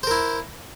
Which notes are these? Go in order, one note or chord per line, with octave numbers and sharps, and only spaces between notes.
E4 A#4 C5